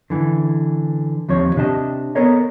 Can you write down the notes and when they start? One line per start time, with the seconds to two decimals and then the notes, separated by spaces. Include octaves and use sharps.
0.10 D3 E3
1.29 D#2 F3 C4 C#5
1.56 C3 D4 G4 D#5 A5
2.15 B3 A4 A#4 C#5 D#5